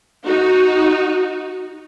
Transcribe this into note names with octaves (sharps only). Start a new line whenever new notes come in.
D#4 F#4